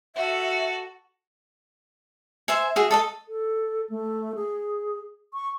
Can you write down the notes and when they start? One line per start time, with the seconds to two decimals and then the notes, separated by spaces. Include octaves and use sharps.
0.16 F#4 A4 E5
2.48 C5 E5 G#5
2.76 F#4 G#4 E5
2.91 A4 D#5 A5
3.28 A4
3.90 A3
4.35 G#4
5.34 C#6